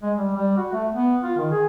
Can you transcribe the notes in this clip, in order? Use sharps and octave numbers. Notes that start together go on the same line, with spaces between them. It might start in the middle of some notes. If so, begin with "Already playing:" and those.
G#3
G3
G3
F#4
A3
B3
F4
D#3
G#4